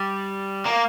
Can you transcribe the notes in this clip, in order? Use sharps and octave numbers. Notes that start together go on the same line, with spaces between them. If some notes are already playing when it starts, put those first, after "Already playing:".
Already playing: G3
A#3